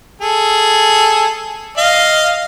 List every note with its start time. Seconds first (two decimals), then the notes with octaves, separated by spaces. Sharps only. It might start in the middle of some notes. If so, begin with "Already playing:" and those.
0.21 G#4 A4
1.78 D#5 F5